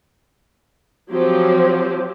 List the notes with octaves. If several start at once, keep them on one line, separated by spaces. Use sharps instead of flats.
F3 F#3 C4 G4